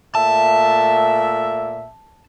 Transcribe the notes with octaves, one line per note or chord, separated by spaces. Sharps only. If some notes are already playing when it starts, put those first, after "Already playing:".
A#2 A3 E5 A5